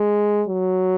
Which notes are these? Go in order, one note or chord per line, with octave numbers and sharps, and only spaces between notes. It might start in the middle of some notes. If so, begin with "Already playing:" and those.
Already playing: G#3
F#3